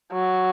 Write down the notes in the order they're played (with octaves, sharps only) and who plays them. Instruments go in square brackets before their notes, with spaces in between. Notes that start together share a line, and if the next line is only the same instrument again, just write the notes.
[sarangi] F#3